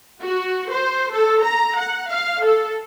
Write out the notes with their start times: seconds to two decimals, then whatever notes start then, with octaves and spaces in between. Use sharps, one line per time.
0.23 F#4
0.71 C5
1.11 A4
1.44 A#5
1.78 F#5
2.09 F5
2.44 A4